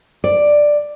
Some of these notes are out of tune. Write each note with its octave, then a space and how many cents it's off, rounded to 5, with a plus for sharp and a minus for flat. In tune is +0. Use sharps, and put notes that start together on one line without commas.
D5 +5